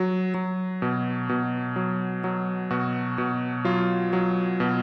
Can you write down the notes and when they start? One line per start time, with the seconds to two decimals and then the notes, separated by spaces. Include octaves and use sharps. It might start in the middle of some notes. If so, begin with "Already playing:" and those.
Already playing: F#3
0.34 F#3
0.82 B2
1.29 B2
1.76 F#3
2.24 F#3
2.70 B2 F#4
3.18 B2
3.65 F#3 F4
4.13 F#3
4.60 B2